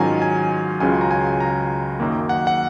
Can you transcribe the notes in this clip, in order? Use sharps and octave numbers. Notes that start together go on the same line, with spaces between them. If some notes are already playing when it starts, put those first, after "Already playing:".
Already playing: G#2 D#3 F#3 C#4 F4 G#5 A#5
G#5
C#2 C#3 F#3 C#4 F4 G#5
A#5
G#5
A#5
F#2 D#3 A#3
F#5
F#5